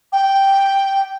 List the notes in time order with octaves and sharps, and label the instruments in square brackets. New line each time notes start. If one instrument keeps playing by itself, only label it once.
[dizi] G5